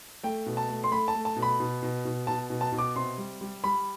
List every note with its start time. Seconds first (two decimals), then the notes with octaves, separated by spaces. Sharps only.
0.23 A3 G5
0.46 B2
0.57 A5
0.69 A3
0.84 C6
0.91 A3 B5
1.08 A5
1.14 A3
1.25 A5
1.36 B2
1.42 B5
1.60 B2
1.83 B2
2.05 B2
2.27 B2 A5
2.50 B2
2.61 A5
2.72 B2
2.78 D6
2.96 C3 C6
3.18 G3
3.41 G3
3.64 G3 B5